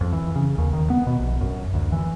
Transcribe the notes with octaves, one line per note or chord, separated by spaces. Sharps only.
F2
E3
C#3
D#2
D#3
B3
B2
A#1
F#2
D2
E3